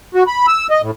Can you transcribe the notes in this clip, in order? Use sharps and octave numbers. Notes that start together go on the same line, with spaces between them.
F#4
B5
E6
D#5
A2